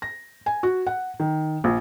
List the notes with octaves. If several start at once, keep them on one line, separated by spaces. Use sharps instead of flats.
A#6
G#5
F#4
F#5
D#3
A#1